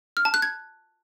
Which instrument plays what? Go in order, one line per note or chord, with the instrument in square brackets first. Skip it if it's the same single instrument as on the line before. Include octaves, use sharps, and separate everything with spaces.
[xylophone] F6
A5
F#6
G#6